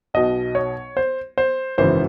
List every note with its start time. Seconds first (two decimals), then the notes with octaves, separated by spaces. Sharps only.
0.14 B1 B2 D#5
0.55 C#5
0.97 C5
1.38 C5
1.78 G#1 F#2 C#3 E3 C5